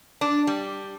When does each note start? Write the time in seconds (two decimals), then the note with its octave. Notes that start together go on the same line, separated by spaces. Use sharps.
0.21 D4
0.47 G3